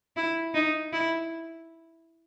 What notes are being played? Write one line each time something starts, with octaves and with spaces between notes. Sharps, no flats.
E4
D#4
E4